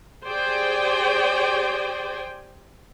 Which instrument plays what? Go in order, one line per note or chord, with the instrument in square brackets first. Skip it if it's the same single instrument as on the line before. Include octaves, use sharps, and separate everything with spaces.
[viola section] G4 G#4 C5 D5 G5 G#5